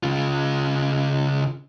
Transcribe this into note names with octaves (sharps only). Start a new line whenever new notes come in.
C#3 F4